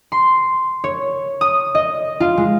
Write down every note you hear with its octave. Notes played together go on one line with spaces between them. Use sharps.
C6
C#5
D#6
D#5
F4
G#3